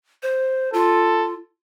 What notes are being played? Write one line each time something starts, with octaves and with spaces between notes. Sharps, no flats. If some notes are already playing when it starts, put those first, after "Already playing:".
C5
F4 A4